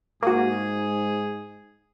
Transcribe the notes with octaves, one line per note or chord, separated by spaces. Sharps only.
G#2 A#3 F#4 G#4